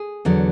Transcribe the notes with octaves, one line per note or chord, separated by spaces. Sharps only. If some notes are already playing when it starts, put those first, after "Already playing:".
Already playing: G#4
E2 D3 F#3